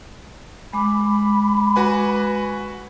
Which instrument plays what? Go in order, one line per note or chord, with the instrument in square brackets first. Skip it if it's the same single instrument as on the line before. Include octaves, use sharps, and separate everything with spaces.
[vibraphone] G#3 D6 [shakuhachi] B5
[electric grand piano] F#4 B4 G#5